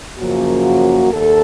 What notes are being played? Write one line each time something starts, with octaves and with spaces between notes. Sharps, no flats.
F#2 C#3 F3 A#3 F#4
D#2 A4